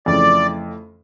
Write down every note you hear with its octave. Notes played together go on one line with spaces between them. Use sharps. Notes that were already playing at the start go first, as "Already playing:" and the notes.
F2 C#3 E3 A3 D5